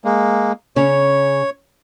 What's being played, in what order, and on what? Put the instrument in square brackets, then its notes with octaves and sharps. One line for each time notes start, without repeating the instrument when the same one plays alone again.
[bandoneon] G#3 A#3
[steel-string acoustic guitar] C#3 C#4 [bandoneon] C#5